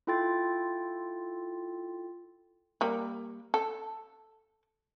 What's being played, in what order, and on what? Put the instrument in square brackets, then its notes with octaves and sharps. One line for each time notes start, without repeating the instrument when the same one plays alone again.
[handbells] E4 F4 A4 G5 C6 A6
[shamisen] G3 A#3
A4